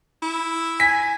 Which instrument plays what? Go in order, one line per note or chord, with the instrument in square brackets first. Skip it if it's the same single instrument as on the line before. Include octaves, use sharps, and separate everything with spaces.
[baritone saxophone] E4
[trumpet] G#5 [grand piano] B6